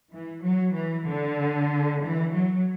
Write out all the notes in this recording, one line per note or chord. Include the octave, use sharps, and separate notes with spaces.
E3
F#3
E3
D3
E3
F#3